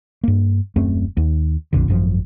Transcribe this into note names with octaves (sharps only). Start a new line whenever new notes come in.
G2 A#3
D#1 F#2 A3 C4
D#2
A#1 F2 A#2 D3
G#1 F#2 F3